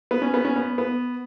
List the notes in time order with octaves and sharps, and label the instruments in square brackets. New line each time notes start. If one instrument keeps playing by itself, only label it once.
[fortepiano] B3
C#4
B3
C#4
B3
B3